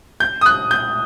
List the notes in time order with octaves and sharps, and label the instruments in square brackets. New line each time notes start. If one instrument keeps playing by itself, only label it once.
[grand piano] G6
D#6
F#6
G6